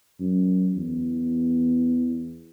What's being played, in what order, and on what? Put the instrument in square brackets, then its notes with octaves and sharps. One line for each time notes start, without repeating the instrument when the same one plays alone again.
[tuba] F#2
E2